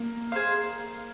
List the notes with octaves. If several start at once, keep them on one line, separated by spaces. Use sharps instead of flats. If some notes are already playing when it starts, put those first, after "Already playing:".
Already playing: A#3
G#4 C5 F5